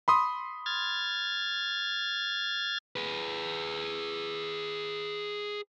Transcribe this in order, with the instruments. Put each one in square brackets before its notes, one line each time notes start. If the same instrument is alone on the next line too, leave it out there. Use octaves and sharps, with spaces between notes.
[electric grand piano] B5 C6 D#6
[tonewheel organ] F6 G#6 A6
[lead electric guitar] G#4 B4